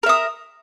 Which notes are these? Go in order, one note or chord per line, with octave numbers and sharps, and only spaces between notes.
A#4 E5 D#6